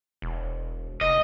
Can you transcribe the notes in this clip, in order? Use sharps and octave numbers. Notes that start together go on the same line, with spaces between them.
E1
F1 D#5